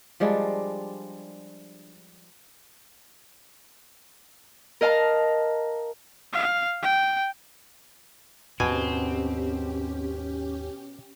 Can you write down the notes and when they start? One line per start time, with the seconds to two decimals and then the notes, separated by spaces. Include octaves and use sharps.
0.20 F3 G3 G#3 D4
4.81 A#4 D#5 F5 A5 A#5
6.33 F5
6.82 G5
8.60 D#2 G#2 B2 C4 C#4 G4 G#5